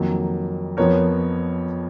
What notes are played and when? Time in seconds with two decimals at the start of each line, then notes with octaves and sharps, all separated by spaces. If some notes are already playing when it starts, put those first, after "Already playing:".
Already playing: F2 D#3 F#3 A#3
0.77 F2 F3 B3 A#4 C#5